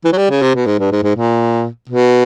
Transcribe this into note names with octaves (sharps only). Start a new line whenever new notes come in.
E3
F#3
G3
C#3
C3
B2
G#2
G2
G#2
G#2
A#2
B2